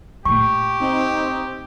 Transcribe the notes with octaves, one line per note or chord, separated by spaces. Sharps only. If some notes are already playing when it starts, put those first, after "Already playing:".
A#2 A3 G4 C#6
C4 D#4